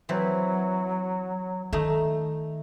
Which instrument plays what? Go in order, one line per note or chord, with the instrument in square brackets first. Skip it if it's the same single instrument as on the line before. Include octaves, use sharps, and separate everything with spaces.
[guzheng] E3 C4 B4 [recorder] F#3
[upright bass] D#3 [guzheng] A3 D#4